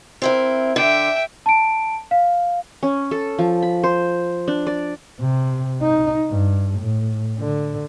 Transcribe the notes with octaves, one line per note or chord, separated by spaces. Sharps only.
C4 E4 A#4
D3 E5 G5
A5 D7
F5
C#4
A4
F3
B5
C5
D4
D5
C3
D#4
G2
A2
D3